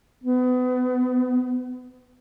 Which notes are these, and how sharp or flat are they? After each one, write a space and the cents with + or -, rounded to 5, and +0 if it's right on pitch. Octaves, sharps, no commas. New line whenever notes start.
B3 +30